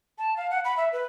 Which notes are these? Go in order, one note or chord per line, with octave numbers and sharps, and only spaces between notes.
A5
F5
F#5
B5
E5
B4